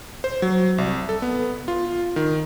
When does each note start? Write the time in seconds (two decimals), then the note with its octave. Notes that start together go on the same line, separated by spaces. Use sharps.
0.24 C5
0.42 F#3
0.78 C2
1.09 A4
1.22 B3
1.68 F4
2.16 D#3